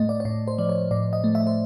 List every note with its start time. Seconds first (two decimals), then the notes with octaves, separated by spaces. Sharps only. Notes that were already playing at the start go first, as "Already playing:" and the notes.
Already playing: A2 A3 D#5
0.09 D5
0.20 C#5
0.25 A2 D5
0.48 C5
0.58 F3 D5
0.69 C#5
0.91 A2 D5
1.13 D#5
1.24 A3
1.35 E5
1.47 C5